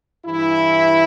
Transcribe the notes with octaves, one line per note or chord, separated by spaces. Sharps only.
G2 E3 E4